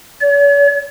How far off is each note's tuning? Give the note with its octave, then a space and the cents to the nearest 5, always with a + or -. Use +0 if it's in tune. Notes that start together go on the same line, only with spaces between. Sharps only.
C#5 +45